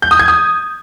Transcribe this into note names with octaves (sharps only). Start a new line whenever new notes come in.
G6
D#6
G#6
D#6